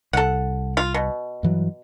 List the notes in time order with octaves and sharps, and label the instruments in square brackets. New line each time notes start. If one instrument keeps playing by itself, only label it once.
[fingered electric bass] C2 [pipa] A4 F#5
[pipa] F4
B2
[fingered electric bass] G2 E3 F#3